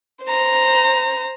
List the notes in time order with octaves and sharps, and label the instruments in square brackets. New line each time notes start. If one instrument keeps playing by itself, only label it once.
[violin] C5 A#5